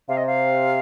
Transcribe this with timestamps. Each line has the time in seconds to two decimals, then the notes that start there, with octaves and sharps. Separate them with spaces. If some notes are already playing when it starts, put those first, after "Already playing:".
0.08 C3 F5
0.17 D#5
0.27 F5